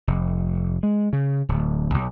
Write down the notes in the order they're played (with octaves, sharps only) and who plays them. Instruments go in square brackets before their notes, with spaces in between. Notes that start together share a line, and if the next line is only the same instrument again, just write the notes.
[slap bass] F1
G#3
C#3
D1
B1